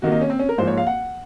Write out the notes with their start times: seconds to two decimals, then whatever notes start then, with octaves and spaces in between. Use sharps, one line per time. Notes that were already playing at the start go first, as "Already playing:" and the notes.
0.02 C3 D#3 A#3 F#4
0.12 D#4
0.21 C#4
0.30 C4
0.39 C#4
0.49 A#4
0.58 G#2 F3 A#3 C5
0.68 C#5
0.78 F5
0.87 F#5